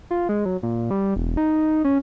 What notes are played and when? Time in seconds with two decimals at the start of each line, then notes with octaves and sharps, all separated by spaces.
0.11 F4
0.29 G#3
0.45 F#3
0.63 A#2
0.91 G3
1.16 E1
1.37 D#4
1.84 C#4